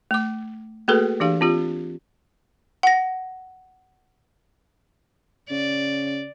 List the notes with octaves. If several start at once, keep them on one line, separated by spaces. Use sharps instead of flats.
A3 D6
A3 A#3 F#4 G#4 A4 B4
E3 D4 G4 F5
C4 F4 G4
F#5 A#6
C#3 D5